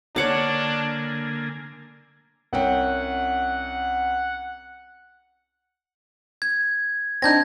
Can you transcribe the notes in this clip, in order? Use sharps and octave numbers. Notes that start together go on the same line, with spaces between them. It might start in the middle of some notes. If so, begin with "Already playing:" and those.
D3 A#3 D4 C#5 F#5 G#5 D6
C2 C#4 F#5 G5
G#6
C4 D4 D#4 G6 G#6 A#6